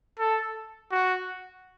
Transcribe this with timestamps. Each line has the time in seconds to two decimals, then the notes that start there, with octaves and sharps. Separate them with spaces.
0.19 A4
0.92 F#4